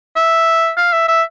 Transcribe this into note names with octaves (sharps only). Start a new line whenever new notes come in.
E5
F5
E5
E5